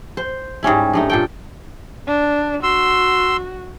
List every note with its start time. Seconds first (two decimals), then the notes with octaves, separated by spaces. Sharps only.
0.17 C5
0.63 G#2 G3 C#4 E4
0.93 G2 A3 D#4
1.10 A#2 A4 G5
2.08 D4
2.63 F#4 C6 E6